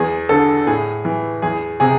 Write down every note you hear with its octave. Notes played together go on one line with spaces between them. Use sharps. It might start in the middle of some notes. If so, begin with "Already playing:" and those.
Already playing: E2 G#4
D3 A4
A2 G#4
E3
E2 G#4
C3 G#4